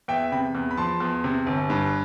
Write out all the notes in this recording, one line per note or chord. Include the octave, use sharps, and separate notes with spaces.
E2 E5 G5
C3 G5 B5
E2
B5
F3 A5 C6
E2
C3
G1
G2